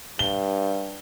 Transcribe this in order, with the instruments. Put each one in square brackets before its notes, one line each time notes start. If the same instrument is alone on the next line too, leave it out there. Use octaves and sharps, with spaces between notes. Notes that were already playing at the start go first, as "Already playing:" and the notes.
[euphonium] G2 [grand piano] G7